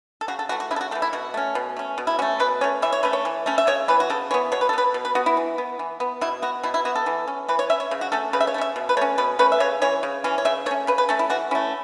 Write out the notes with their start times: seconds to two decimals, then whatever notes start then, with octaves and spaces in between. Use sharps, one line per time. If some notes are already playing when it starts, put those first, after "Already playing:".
0.21 A4
0.28 C#3 F#4
0.39 A4
0.49 E3 F#4
0.52 A3
0.60 F#4
0.71 C#3 E4
0.76 A4
0.81 F#4
0.91 E3 A3 A4
1.02 E4
1.13 B2 F#4
1.34 A3 C#4
1.55 B2
1.77 A3 C#4
1.98 B2
2.07 E4
2.19 C#4 F#4
2.22 A3
2.40 B2 B4
2.61 A3 C#4 C#5
2.82 E3 E5
2.93 C#5
3.03 A3 C#4 B4
3.13 C#5
3.25 E3
3.46 A3 C#4
3.58 E5
3.67 C#3 C#5
3.88 E3 B3 B4
4.00 F#4
4.10 C#3 A4
4.31 E3 C#5
4.34 B3
4.52 B2 C#5
4.61 B4
4.69 A4
4.73 B3 B4
4.94 B2
5.05 B4
5.15 B3 F#4
5.26 E4
5.37 E3
5.58 B3
5.79 E3
6.00 B3
6.21 B2 E4
6.42 B3 F#4
6.63 B2 E4
6.74 E4
6.85 B3 F#4
6.96 A4
7.06 E3
7.28 C#4
7.49 E3 B4
7.59 C#5
7.70 C#4 E5
7.80 C#5
7.91 C#3
8.01 F#4
8.12 A3 C#4 A4
8.33 C#3 B4
8.41 E5
8.47 C#5
8.54 A3
8.58 C#4 E5
8.76 B2
8.89 B4
8.97 A3 C#5
9.01 C#4
9.18 B2 B4
9.39 A3 C#4 B4
9.52 E5
9.60 C#3 C#5
9.82 E3 C#4 C#5
10.03 C#3
10.24 E3 C#4
10.38 C#5
10.45 C#3 E5
10.66 A3 C#5
10.71 C#4
10.87 C#3 B4
10.98 B4
11.09 A3 C#4 A4
11.19 E4
11.30 E3 F#4
11.51 A3 C#4 E4